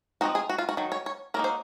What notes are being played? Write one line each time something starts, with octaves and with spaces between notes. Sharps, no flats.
F3 G#3 C4 D#4 F#4
G#4
F#4
F4
F#4
D#3 F#3
C#5
C#5
F#3 A#3 D#4 A#4
C5